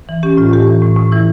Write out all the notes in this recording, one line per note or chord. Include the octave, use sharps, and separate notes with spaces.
E3
C#4 G4
A2 F4
A2 G4
E3
A2
A2
E3 E4